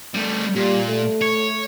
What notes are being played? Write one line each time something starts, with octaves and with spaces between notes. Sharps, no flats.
G3 A3
A#2 G3
A3
C#5